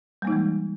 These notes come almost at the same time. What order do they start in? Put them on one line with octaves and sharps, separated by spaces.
G3 A#3 D#4 E3 G#3